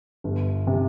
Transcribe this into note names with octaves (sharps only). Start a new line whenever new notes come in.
G1
C3